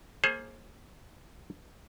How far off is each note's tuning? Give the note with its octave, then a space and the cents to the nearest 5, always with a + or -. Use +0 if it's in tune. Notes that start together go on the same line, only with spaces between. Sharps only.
A#3 +0 G#4 +25 C5 +40